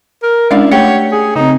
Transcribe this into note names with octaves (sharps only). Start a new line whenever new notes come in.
A#4
G#3 C#4 D4 E4 D5 F5
A3 G4 C#5 F#5
G#4
C#3 C4 D#4